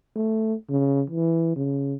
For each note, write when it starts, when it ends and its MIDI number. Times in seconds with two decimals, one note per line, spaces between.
0.16 0.54 57
0.69 1.02 49
1.10 1.55 52
1.56 1.94 49